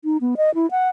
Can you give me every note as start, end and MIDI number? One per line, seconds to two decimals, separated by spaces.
0.04 0.17 63
0.21 0.35 59
0.37 0.53 75
0.55 0.69 64
0.71 0.89 78